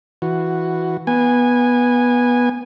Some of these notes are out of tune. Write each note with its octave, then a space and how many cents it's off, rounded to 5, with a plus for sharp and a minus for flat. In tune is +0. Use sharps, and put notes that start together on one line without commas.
E3 +0 F#4 +0
B3 -15 G#5 -15